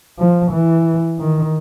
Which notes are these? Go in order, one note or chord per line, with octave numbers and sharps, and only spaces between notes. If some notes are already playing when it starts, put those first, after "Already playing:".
F3
E3
D#3